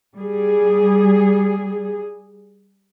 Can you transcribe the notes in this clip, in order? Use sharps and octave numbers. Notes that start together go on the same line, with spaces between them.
G3 G#4